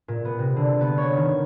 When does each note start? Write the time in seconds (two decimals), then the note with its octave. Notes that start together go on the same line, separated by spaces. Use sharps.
0.08 A#2
0.25 B3
0.39 C3
0.56 D3
0.81 B3
0.98 C#5
1.17 D#3